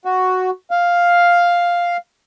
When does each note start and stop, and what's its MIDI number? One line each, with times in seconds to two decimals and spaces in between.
0.05 0.50 66
0.71 1.97 77